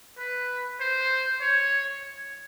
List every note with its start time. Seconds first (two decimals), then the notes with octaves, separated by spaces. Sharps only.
0.18 B4
0.80 C5
1.41 C#5